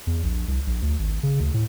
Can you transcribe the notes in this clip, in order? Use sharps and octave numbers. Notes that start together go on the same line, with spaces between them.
E2
A#1
C2
A#1
D2
G#1
C#3
D2
A2